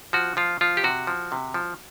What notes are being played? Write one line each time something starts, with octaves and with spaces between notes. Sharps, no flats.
F3 F#4
F3 F4
F3 F4
G4
C3 F#4
F3
C3
F3